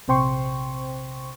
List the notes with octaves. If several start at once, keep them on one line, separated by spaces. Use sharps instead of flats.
A#1 C3 C5 G5 C6 C#6